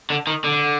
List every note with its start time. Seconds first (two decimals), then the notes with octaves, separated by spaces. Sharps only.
0.10 D3
0.27 D#3
0.44 D3